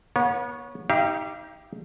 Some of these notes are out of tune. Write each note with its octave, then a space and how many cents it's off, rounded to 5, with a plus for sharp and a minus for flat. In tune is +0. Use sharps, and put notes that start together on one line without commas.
B3 -40 C#5 +0
D#4 +25 G4 +0 F5 -35